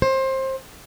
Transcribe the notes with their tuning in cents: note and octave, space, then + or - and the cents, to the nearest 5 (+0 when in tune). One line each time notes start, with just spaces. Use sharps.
C5 +25